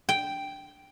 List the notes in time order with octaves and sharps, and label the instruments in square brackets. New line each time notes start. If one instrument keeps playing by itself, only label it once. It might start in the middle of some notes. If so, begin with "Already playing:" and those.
[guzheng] G5